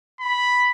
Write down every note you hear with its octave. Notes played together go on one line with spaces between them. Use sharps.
B5